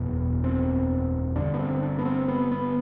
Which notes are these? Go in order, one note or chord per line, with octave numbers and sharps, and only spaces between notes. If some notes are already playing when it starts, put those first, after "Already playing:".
Already playing: F#1 E2 B2 B3
C4
G1 G2 D3 D4
B3
C4
D4
B3
C4
B3
B3